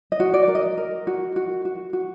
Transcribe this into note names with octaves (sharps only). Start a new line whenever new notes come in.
D#5
F#4
D5
A#4
D#5
A#4
F#4
F#4
F#4
F#4